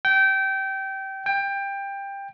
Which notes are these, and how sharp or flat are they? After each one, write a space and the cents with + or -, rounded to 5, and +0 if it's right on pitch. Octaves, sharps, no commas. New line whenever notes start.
G5 -20
G5 +20